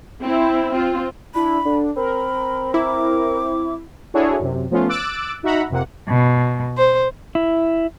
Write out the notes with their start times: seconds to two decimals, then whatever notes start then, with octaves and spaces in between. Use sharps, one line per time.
0.23 C4 E4
0.72 C4 F4
1.34 D4 E4 B5
1.65 D3 D4
1.97 C4 A#4 B5
2.74 E4 D6
4.14 D4 E4 F#4 G#4 A4 C#5
4.39 F#2 C3
4.71 F3 A3 B3 C#4 F4
4.89 D6 E6 F#6 A6 D7
5.43 D#4 F#4 E5 F#5 A#5 B5
5.69 F2 C3 A#3 F#5
6.09 B2
6.77 C5
7.35 E4